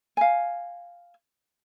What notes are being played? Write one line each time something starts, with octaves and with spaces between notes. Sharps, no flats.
F5 G#5